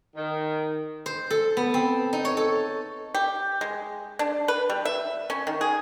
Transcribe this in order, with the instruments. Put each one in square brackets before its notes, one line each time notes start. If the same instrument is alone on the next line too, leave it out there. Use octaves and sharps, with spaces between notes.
[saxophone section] D#3
[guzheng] C5
A4
B3
C4
D#4
C#5
A4
[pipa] G4
G#3
D4
B4
G3
E5
C#4
D#3
G#4